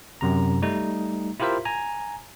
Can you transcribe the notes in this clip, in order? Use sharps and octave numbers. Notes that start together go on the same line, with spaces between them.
F#2 C3 A#5
G3 A3 D#4
E4 F4 G4 A#4 C5 E5
G#5 A#5